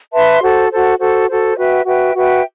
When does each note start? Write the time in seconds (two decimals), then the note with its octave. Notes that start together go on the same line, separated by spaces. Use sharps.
0.12 B4 E5 A5 C6
0.41 F#4 A4 C5
0.71 F#4 A4 C5
0.98 F#4 A4 C5
1.28 F#4 A4 C5
1.57 F#4 B4 E5 G5
1.85 F#4 B4 E5 G5
2.15 F#4 B4 E5 G5